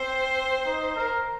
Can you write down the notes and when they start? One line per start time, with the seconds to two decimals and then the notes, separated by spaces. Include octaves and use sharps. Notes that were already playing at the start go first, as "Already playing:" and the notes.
Already playing: C4 C5
0.66 D#4
0.96 A#4